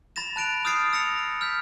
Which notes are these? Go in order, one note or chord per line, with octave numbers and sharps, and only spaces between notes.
B5 A6 A#6 E7
A5 F#6 D7 F7
D#6 F6 G6 A6 C7 D7
E6 A#6 C#7 F7
F6 G6 B6